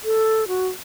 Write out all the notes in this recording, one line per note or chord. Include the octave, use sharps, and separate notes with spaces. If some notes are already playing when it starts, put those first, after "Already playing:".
A4
F#4